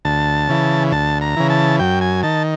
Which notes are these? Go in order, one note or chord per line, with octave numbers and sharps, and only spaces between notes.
D2 A5
C#3 E3
D2 A5
A#5
C#3 E3
A5
F#2 G5
G#5
D#3 A5